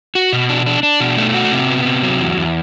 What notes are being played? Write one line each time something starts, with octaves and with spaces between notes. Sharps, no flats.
F#4
B2
D4
D4
D4
B2
A3
F#4
C3
B3
C3
F#3
E2
E2